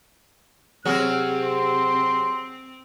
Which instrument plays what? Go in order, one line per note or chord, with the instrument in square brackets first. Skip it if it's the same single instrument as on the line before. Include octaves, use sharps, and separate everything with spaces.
[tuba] C3 [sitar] F#3 F#4 G#4 [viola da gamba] C4 [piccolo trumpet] F6
[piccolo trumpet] C6